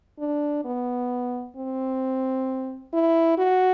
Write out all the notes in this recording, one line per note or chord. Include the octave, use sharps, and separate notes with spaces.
D4
B3
C4
E4
F#4